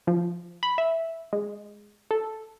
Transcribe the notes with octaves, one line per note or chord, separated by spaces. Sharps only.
F3
B5
E5
G#3
A4